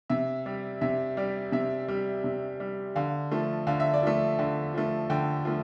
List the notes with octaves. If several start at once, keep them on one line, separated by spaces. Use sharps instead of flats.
C3 E5
G3
C3 E5
G3 D5
C3 E5
G3
C3
G3
D3 F5
F3 A3
D3 F5
E5
D5
F3 A3 E5
D3
F3 A3
D3 G5
F3 A3